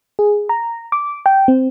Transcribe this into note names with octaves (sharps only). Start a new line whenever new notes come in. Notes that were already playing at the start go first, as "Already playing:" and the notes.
G#4
A#5
D6
G5
C4